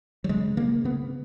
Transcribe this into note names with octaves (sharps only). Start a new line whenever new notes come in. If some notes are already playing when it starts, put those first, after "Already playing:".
F#3
C#3 G#3
C#3 A#3
C#3 B3